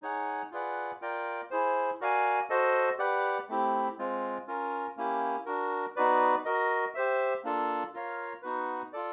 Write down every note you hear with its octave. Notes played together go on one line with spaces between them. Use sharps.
D#4 G#4 C#5 F#5
F4 G#4 B4 D5 F#5
F4 A#4 D5 G5
E4 G#4 C5
F#4 A#4 D5 F5 G#5
F#4 A4 C5 D#5
G4 B4 D5 F#5
A3 C4 E4 G4
G#3 C4 F4
C#4 F4 A#4
A#3 C#4 E4 G4
D4 F#4 A#4
B3 D#4 F#4 B4 D5
F#4 A#4 D#5
G4 C5 E5
A#3 D4 F4 A4
F4 A#4 C#5 F5
B3 D#4 F#4 B4
F4 A4 D5